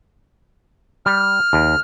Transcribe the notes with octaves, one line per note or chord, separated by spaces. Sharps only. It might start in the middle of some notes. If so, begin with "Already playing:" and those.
G3 F6
D#2